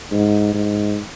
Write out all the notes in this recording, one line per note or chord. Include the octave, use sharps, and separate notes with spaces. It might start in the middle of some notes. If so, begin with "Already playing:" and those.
G#2
G#2